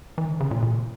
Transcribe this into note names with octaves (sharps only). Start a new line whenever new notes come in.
E3
D3
C#3
A#2
A#2